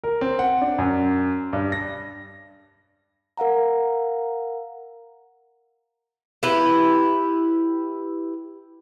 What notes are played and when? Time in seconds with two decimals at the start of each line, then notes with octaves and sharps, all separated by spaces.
0.04 A#4
0.21 C4
0.39 F#5
0.61 D4
0.78 F#2
1.53 G2
1.72 A#6
3.37 A#4 F5 F#5 A#5
6.43 E4 G4 B4